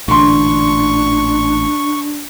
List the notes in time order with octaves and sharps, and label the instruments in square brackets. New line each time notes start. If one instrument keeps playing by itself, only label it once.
[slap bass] A1 A#2 E3 [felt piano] D3 C6 [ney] D4 [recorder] C#6